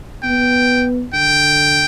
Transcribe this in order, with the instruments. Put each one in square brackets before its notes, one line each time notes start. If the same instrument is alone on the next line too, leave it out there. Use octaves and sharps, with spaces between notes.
[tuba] B3 [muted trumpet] G5
[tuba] D3 [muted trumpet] G5